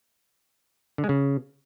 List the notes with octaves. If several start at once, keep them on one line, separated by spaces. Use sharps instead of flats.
D3
G#3
C#3